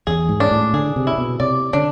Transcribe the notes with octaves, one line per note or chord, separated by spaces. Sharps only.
E2 G#4
G#2
D4
A2
D3 G#4
C3
E4
C3
B2
C3 D5
D3 D4